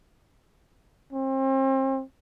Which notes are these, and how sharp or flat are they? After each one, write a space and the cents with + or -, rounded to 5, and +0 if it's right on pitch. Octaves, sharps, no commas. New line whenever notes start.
C4 +35